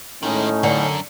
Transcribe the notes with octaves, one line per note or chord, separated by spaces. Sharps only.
A2 D#3 G#3 C#4 D#4
F#2 D3